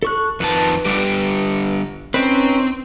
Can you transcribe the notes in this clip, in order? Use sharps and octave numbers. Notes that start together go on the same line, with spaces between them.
A4 C#6 F#6
F2 D#3 B4 A5
D3 G3 G4
C4 C#4 D#4 B4